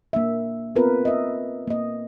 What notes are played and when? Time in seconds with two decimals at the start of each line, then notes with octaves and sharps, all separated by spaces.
0.13 A#3 D4 E5
0.75 B3 C4 F4 A#4 B4
1.05 D#5 E5
1.67 A#3 D#5